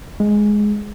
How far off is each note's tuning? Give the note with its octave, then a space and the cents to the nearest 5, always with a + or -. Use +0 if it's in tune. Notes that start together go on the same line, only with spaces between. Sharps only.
G#3 +5